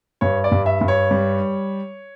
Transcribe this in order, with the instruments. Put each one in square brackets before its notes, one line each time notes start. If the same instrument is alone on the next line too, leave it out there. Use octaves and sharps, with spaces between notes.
[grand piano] G2 C#5
D5
G2
E5
G2
C#5
G3